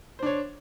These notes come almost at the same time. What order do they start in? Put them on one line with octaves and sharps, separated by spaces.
C5 D4 C#5